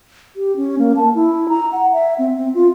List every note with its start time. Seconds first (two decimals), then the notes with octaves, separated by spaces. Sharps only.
0.36 G4
0.56 C#4
0.79 A#3
0.96 A5
1.15 E4
1.49 A#5
1.72 F#5
1.93 E5
2.18 C4
2.36 C4
2.54 F4